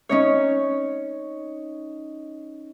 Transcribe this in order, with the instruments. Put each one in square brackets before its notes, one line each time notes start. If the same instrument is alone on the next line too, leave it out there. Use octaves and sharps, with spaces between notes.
[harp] C#4 D#4 C#5